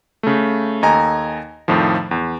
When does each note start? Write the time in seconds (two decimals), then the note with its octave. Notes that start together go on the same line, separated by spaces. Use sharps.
0.23 C#3 A3
0.82 D#2 A4 D#5 G#5 A#5
1.68 F2 A2 D#3 F3
2.11 E2